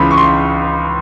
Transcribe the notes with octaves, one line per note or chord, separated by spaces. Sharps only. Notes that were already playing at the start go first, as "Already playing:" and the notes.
Already playing: C#2 C#3 E3 B5 C6
C#6
C6